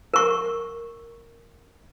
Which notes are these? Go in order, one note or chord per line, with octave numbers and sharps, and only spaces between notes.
A#4 C#6